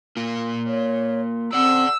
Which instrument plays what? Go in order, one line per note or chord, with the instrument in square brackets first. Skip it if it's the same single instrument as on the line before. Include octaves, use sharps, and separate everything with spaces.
[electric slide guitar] A#3 F4
[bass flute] C#5
[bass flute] C4 [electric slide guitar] D5 F#5 [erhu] E6